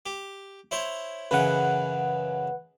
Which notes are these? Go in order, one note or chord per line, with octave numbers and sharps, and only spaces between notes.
G4
E4 C5 C#5
F#2 C#3 E3 B4 F#5